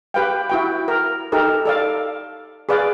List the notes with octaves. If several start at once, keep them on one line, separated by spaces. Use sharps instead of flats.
G4 B4 F5 G5
E4 F#4 G5
A#4
D#4 G4 A4 A#4
A4 D5 F5
G#4 B4 D5 F5